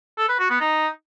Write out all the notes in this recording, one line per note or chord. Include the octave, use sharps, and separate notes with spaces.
A4
B4
F#4
B3
D#4